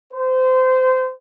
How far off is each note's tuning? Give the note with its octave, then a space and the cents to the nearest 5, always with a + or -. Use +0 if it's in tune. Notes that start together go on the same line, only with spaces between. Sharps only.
C5 -25